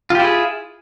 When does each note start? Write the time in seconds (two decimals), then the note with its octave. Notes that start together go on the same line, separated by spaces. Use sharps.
0.10 F4
0.15 G4
0.20 E4
0.24 G#4